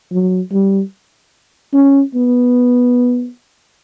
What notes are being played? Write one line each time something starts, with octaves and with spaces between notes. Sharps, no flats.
F#3
G3
C#4
B3